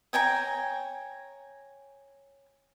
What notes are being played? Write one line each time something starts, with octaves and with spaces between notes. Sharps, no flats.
C#5 G5 G#5 A#5